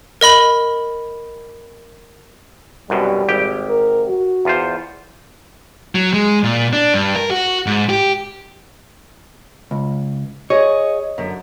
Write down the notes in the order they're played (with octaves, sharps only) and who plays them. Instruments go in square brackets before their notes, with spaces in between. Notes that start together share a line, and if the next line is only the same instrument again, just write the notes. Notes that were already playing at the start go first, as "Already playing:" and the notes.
[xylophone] A#4 D#5 B5 F#7
[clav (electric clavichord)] C2 F#2 B2 [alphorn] G3
[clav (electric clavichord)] G#1 G4 G5
[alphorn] A#4
F#4
[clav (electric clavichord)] E2 F4 C5
[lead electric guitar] F#3
G#3
A#2
D4
G2
A#4
F#4
G#2
G4
[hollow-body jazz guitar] C#2
[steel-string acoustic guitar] G#4 D#5 [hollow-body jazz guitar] C#5
[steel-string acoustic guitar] F#2 D3